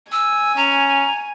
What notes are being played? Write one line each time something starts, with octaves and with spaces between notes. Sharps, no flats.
G#5 E6
C#4 A#5